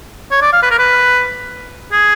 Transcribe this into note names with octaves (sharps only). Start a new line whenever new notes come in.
C#5
D5
F5
B4
A#4
B4
G#4